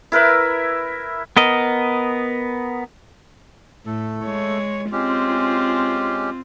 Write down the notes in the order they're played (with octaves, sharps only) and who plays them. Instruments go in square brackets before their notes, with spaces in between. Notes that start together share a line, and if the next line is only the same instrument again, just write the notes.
[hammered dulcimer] E4 A#4 B4 E5
[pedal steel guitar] B3 A#4 D#5
[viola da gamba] A2 [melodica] A3 A4
[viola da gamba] G#3 C#5
[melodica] G#3 C#4 G4 [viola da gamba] C4 F4